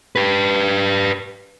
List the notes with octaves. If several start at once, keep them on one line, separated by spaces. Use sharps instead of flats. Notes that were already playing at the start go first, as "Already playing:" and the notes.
G4 B4